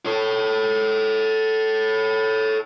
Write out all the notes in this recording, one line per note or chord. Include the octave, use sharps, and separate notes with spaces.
A4 C#5